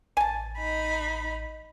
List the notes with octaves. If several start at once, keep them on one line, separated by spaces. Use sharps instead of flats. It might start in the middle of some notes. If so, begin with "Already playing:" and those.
A1 G#5 A5
D#4 B5